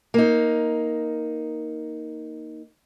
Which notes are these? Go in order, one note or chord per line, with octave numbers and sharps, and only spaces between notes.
A#3 D#4